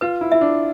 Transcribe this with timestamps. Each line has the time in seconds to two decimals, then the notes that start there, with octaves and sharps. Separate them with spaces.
0.01 F4 B4
0.21 E4
0.32 E4 E5
0.41 D4